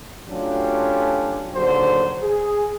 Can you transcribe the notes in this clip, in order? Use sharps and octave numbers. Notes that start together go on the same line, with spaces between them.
F#3 A3 C#4 D4 F4 G4
A#1 D#2 D3 F#3 F#4 C5
G#4